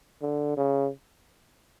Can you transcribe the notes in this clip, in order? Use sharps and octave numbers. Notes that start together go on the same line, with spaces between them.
D3
C#3